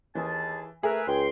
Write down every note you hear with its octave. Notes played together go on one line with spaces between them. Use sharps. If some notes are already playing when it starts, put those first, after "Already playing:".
D#2 E3 G#4 A5
A3 G#4 A#4 B4 E5
C#2 G5 C6